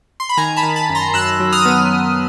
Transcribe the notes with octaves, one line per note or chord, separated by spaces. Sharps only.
C6
B5
D#3 G#5 A#5
A5 B5
D#3
A5 B5
F#2
A#5 C6
F#2 E6 F#6
F#3
D#6 F6
B3